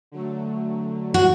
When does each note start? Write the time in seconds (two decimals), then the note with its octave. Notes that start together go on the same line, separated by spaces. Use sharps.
0.12 D3 F#3 A3
1.14 F#4